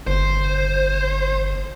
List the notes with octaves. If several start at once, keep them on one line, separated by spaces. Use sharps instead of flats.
G1 C5